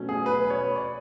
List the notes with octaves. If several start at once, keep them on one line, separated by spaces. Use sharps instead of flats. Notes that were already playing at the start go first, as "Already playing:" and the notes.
Already playing: B2 F#3 A3 C#4
G#4
B4
C#5
D5